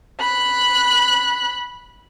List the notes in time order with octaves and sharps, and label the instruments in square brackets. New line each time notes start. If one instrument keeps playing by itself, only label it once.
[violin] B5 F#6